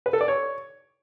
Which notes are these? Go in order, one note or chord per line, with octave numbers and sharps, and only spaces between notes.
B4
A4
D5
C#5